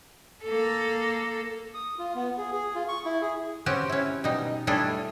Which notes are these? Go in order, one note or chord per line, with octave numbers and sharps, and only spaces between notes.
A#3 A4
D#6
F4
B3
G#4
G#4
F4
C#6
E4
G#4
C4 C#4 F#4 G4 B4
C#4 E4
B2 G3 D#4
G3 A3 D4 E4 G#4 A4